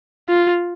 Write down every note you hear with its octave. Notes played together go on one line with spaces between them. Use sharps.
F4